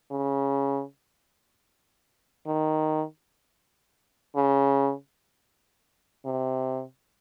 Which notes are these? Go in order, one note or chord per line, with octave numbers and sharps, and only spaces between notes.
C#3
D#3
C#3
C3